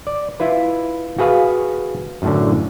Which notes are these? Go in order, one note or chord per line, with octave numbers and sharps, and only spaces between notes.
D5
E4 F4 B4
F#4 G#4 B4 F5
F#2 A2 D3